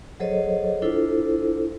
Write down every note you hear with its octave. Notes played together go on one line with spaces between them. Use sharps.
F#3 G#4 A4 C5 C#5 D#5
D4 E4 F4 A4 C5